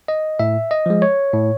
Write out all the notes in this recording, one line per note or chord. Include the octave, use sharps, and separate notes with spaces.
D#5
A2 E5
D#5
F3 G#3
C#5
A2